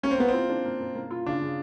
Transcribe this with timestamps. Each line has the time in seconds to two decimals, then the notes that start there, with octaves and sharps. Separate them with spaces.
0.03 A#3 C#4
0.11 C4
0.18 A#3 B3
0.28 C4 F4
0.49 D4
0.65 A#3
0.80 A#3
0.95 A#3
1.11 F4
1.26 C#3 D4
1.42 C#3